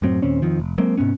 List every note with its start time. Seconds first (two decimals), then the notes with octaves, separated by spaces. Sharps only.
0.02 F#2 A2 F#3 C4
0.22 D#2 A#2 C4 C#4
0.42 F2 D#3 F3
0.60 F1
0.78 F#3 G#3 A#3 C4
0.97 G#2 C3 B3 C#4